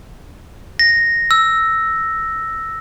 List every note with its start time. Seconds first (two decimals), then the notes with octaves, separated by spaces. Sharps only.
0.79 A#6
1.31 E6